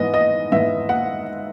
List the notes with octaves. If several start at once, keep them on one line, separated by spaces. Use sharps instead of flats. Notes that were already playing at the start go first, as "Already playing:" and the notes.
Already playing: G#2 E3 B3 D#5
D#5
G#2 E3 B3 E5
F#5